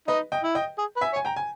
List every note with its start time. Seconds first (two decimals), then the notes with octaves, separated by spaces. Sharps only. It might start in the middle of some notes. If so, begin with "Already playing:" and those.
0.08 D#4 B4 D#5
0.32 D#5 G5
0.44 E4
0.55 D#5 G5
0.78 G#4
0.96 B4
1.01 E5 G#5
1.13 C#5
1.16 G#5
1.25 G5 A#5
1.36 G#5